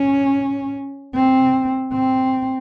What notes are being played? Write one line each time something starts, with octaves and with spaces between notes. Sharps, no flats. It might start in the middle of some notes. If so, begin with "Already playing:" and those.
Already playing: C#4
C4
C4